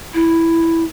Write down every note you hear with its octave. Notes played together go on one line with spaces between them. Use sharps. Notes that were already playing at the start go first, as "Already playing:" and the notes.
E4